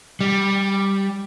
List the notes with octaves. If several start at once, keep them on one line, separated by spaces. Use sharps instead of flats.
G3